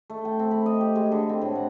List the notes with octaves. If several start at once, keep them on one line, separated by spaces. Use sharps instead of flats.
A3
G5
C4
B5
D#5
G4
G#3
D3
C4
A2
F#5